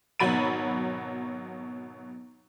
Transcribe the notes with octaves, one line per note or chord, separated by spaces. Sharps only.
G#1 B2 F#3 B5 A6 D#7